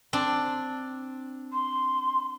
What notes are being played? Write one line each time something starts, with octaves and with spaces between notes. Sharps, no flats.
C4 D4
C6